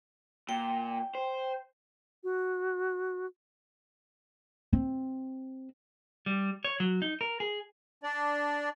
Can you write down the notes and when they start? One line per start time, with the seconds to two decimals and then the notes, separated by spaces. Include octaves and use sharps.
0.49 A#2 G5
1.15 C5
2.24 F#4
4.73 C4
6.26 G3
6.64 C#5
6.80 F#3
7.02 D#4
7.21 A#4
7.40 G#4
8.04 D4 D5